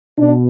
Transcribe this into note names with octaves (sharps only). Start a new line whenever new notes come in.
B2 D4